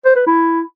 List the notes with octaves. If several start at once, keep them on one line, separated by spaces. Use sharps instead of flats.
C5
B4
E4